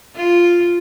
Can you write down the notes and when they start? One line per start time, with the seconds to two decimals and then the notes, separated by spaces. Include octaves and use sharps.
0.17 F4